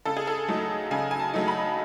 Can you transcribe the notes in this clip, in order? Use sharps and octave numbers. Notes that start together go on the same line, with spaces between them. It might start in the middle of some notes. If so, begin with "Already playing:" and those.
C#3 A4
G#4
A4
F#3 A3 D#4
C#3 G#5
G#5
A5
F#3 A3 D#4
B5